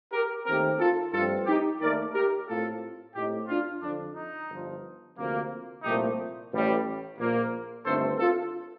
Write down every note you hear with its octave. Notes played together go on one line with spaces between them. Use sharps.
G4 A#4
D#2 D#3 A3 C4 G4 A#4
F4 A4
G2 F3 A3 C4 F4 A4
D#4 G4
D#2 D#3 A3 A#4 D5
G4 A#4
A2 A3 C4 F4 A4
A2 A3 C4 D#4 G4
D4 F4
F2 D3 F3 D4
D#4
G1 G2 F3
D2 C3 F3 A#3
C2 A#2 F3 A3 C4 D#4 G4
A1 A2 G3
A#1 A#2 F3 A#3
G1 G2 D#3 A3 C4 A4 C5
F4 A4